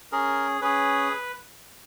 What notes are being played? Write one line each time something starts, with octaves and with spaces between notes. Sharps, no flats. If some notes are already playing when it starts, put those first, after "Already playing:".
C#4 G#4 A#4
C#4 G#4 B4